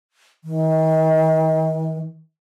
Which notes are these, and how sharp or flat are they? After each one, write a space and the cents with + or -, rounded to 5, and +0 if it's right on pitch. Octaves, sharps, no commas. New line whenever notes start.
D#3 +40